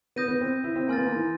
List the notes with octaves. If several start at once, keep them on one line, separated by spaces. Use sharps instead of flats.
B3 D#6 G6 A#6 D#7
B3
C4
E4
C4
A#3 G#5 C6 F6 A6
B3
A#3
E3